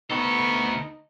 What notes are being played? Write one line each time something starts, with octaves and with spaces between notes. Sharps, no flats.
D2 B3 D#4 A4 B5 C#6